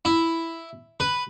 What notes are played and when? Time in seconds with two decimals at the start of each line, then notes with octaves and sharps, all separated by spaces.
0.05 E4
1.00 B4